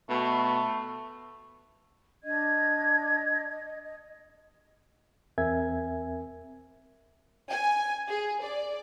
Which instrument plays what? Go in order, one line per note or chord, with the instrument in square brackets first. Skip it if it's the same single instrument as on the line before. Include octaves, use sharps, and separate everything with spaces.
[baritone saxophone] B2 [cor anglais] A3
[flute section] D4 D#5 G#6
D#5
D#5
[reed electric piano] E2 C4 A#4 E5 G#5 G#6
[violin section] G#5
G#4
D5